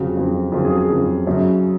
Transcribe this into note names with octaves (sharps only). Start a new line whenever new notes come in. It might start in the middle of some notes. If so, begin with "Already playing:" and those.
Already playing: F2 C#3 F#3 F#4
F2 C#3 F#3
F2 C#3 F#3 F4
G#4
G#4
F2 C#3 F#3
F#2 C#3 F#3